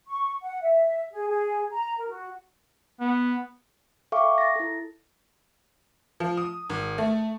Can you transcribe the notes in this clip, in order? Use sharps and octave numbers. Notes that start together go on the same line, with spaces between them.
C#6
F#5
E5
G#4
G#4
A#5
A#4
F#4
B3
A4 E5 F5 G5 C#6 D6
A6 A#6
E4 A4
F3
D#6
G#1
A3